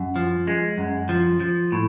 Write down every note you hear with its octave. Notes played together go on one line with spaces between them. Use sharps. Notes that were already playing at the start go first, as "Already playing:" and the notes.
Already playing: F#2
F3
G#3
F#2
F3
F3
A2